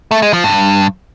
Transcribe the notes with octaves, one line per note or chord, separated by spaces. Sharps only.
A3
G#3
F3
G2